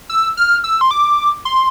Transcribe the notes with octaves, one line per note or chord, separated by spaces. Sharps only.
E6
F6
E6
C6
D6
C6